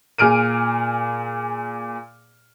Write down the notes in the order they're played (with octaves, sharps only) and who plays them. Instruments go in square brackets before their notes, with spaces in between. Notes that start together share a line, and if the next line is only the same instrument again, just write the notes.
[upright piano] A#2 G#4 F6 D7 D#7